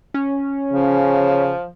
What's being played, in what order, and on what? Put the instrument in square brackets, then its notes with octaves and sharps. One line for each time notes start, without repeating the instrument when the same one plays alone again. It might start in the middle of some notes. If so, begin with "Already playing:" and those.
[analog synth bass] C#4
[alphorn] C#3 [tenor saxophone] F3